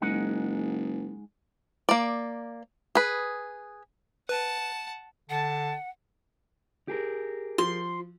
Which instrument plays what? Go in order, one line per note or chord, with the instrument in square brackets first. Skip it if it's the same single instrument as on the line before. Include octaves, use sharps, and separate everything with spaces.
[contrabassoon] F#1 [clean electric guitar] G#3 D#4 F#5
[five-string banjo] A#3 D5
G#4 B4
[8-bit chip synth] B4 [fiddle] F#5 A5
[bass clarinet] D3 [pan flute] F#5 [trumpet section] A5
[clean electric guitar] G4 G#4 A#4
[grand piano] F3 [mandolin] C6